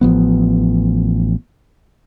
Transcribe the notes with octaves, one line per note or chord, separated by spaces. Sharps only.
A1 F3 B3